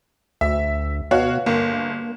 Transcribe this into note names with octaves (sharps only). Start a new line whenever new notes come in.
D2 E5
B2 F#4 C#5 F5
G1 A#3